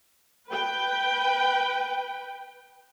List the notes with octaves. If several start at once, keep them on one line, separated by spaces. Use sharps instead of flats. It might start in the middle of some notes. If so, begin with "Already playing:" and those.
B4 G5